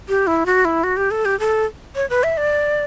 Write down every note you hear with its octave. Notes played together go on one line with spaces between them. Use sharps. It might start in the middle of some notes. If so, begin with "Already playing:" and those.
G4
E4
F#4
E4
F#4
G4
A4
G4
A4
C#5
B4
E5
D5